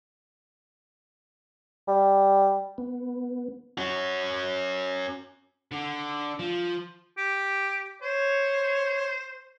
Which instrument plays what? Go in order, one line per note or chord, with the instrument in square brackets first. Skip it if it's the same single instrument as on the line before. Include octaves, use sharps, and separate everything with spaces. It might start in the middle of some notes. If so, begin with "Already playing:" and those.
[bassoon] G3
[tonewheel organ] B3
[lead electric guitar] C#4 F#4
[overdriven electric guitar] D3
F3
[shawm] G4
[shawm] C5 [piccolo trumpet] C#5